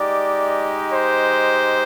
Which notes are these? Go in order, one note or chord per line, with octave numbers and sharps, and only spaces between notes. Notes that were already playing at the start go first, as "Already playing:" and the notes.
Already playing: G#3 D#4 G4 D5
C5